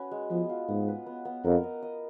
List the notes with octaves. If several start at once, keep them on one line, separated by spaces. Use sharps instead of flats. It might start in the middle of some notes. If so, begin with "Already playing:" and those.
Already playing: C#4 F#4 B4
G#3
F3 B3
F4
G#2 B3
B4
B3
B3
F2 A#4
D#5
D#5